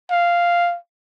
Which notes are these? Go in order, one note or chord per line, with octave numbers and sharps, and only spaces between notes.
F5